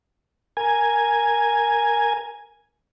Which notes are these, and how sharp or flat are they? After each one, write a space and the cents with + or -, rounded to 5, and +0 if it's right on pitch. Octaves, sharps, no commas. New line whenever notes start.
A#4 +0 G#5 +0